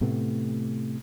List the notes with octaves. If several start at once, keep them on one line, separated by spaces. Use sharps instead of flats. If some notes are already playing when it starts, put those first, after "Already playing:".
A2 C3 A3 B3